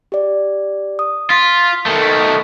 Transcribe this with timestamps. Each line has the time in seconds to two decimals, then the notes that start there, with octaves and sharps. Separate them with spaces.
0.12 G4 D5
0.99 D#6
1.30 F4 B6
1.86 D#3 A3
2.02 C#6 B6